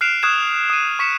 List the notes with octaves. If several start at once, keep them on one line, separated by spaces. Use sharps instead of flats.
F6 F#6 C7 D7 E7 F7
C#6 D#6 F6 F#6 G#6 E7
D#6 D#7
C#6 B6 C#7 E7